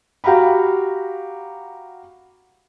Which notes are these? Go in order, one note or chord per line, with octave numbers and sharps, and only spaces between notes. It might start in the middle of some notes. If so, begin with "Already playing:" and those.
F#4 G4 F5 A#5 B5